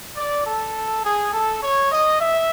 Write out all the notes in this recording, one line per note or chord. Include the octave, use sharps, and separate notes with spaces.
D5
A4
G#4
A4
C#5
D#5
E5